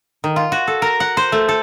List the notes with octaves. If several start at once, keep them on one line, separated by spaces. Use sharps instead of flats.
D#3
F4
F#4
A4
A#4
F#5
C5
A3
A4